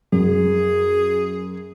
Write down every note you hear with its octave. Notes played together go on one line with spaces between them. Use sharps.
F#2 G#4